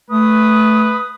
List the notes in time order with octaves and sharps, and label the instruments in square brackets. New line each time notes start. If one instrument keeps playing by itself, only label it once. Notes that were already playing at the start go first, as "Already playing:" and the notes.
[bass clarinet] A3 [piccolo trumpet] B4 [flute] D#6